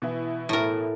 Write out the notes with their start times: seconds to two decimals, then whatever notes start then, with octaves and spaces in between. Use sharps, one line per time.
0.02 B2 E3 E4
0.49 A2 A#4